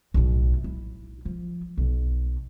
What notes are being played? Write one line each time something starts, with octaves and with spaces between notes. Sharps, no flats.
B1 A2
E4
F3
B1